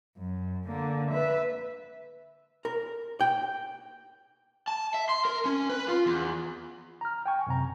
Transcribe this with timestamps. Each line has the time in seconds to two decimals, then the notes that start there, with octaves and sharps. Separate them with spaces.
0.18 F#2
0.67 D3 A#3
1.11 B4 E5
2.65 A#4
3.21 G5
4.68 A5
4.94 E5
5.09 C6
5.25 A#4
5.45 C#4
5.69 B4
5.88 F4
6.06 E2
7.01 A#5 F6
7.26 G5 G#5 C#6
7.47 F#2 C3 A#5